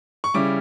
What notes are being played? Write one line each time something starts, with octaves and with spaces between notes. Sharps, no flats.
C#6
C#3 G3 C#4 E4 D6